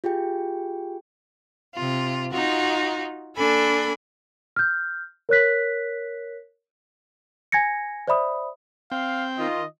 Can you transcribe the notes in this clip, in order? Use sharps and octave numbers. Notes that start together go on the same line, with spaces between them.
F4 G4 G#4 G5
C3 F4
D#4 F4 F#4
A#3 D4 A4 G#5 B5
F6 G6
A#4 C#5 F#6 B6
G#5 G#6 A#6 C#7
C5 D5 E5 B5 D#6
C4 F5 G5
D#3 F4 D#5